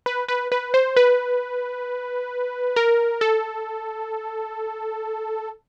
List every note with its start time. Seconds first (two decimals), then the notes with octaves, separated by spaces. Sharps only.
0.06 B4
0.28 B4
0.52 B4
0.74 C5
0.96 B4
2.76 A#4
3.21 A4